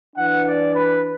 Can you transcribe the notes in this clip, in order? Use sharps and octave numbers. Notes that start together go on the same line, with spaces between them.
E3 D4 F#5
D5
B4